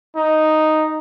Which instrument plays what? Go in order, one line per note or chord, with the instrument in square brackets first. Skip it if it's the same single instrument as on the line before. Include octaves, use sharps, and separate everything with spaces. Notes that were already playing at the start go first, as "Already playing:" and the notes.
[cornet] D#4